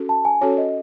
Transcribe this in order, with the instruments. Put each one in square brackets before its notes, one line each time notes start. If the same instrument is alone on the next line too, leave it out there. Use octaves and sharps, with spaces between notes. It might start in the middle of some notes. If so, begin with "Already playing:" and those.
Already playing: [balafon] C#4 F#4 A4
[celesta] A5
G#5
[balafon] C#4 F#4 A4 [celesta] C#5
[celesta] D#5